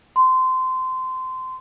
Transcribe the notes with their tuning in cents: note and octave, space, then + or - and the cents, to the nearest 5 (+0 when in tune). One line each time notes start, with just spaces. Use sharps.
C6 -20